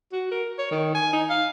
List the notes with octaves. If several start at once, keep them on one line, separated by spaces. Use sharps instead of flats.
F#4
A#4
C#5
D#3
G#5
D#4
F5